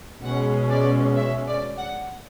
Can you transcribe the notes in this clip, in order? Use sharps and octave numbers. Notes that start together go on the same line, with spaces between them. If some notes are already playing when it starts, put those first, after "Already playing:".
B2 G#3 C#4 F#5
D5
E5
D5
F#5